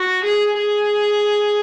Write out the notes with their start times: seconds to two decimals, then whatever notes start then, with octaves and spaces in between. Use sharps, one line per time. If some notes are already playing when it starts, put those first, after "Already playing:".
Already playing: F#4
0.24 G#4
0.58 G#4